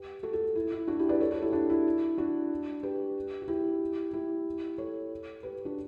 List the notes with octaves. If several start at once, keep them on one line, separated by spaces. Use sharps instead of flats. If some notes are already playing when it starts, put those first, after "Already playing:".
Already playing: G4 B4
F#4 A4
F#4 A4
E4
E4
D4 F#4
E4 G4
B4 D5
A4 C#5
F#4 A4
E4 G4
D4 F#4
E4
D4 F#4
G4 B4
F#4
E4 G4
E4 G4
A4 C#5
G4 B4
D4 F#4